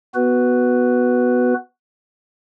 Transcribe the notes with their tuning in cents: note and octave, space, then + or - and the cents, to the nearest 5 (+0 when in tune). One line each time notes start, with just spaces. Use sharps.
B3 +0 F#4 +0 B4 +0